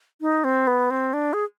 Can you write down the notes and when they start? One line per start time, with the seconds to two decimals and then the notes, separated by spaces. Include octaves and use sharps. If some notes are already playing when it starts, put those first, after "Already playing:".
0.21 D#4
0.44 C4
0.67 B3
0.90 C4
1.13 D4
1.33 G#4